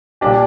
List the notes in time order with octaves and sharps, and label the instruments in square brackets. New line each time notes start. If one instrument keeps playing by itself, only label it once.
[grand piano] A#2 G3 D4 G4